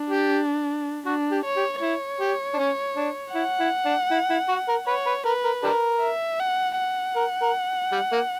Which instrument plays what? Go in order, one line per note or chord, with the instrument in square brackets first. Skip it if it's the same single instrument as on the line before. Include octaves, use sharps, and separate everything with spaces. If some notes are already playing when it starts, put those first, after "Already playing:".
Already playing: [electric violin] D4
[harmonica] G4
[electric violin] D4 [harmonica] F#4
[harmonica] G4
[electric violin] C#5
[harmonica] G4
[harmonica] E4 [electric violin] C#5
[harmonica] G4
D4
C#4
D4
[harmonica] E4 [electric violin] F#5
[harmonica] E4
D4
E4
E4
F#4
A#4
[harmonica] B4 [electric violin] C#5
[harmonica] B4
[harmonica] A#4 [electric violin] B4
[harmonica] A#4
D4 G4 A#4
[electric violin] E5
F#5
F#5
[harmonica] A#4
A#4
G3
A#3